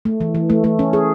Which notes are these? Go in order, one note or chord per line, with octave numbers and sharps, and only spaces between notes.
A3
E3
E3
A3
A3
C#4
G#4